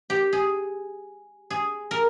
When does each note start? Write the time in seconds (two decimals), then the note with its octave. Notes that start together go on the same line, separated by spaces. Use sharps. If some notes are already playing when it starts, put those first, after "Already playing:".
0.10 G4
0.33 G#4
1.50 G#4
1.91 A#4